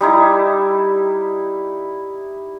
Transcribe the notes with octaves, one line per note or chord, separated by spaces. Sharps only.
G3 D#4 E4